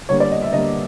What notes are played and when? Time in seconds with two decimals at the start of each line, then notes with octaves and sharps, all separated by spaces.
0.09 D3 G3 A#3 C#5
0.20 D5
0.31 D#5
0.42 E5
0.53 D3 G3 A#3 D#5